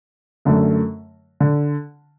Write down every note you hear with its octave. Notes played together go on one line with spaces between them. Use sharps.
F#2 D3 A3
D3